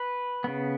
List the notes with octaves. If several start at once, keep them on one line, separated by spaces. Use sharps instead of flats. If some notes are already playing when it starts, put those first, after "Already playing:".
Already playing: B4
C#3 B3